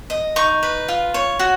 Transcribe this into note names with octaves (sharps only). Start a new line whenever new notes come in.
D#5
D#4 C#6
B4
F4
C#5
F#4